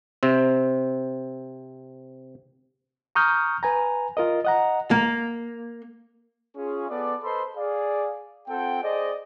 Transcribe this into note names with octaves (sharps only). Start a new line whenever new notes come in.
C3 C4
A#5 C#6 D#6 F6 G6
B4 G#5 A#5
F4 A#4 D#5
D#5 F#5 A#5
A#3
C#4 F4 G#4
B3 G#4 A4 D5
A4 B4 C5 D#5 B5 C6
G#4 D5 F5
C4 F4 A4 F#5 G5
G#4 C5 D5 D#5